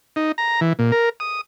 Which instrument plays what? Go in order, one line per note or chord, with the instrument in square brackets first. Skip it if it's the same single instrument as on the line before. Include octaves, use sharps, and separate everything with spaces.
[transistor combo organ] D#4
A#5
E3
A#2
A#4
D#6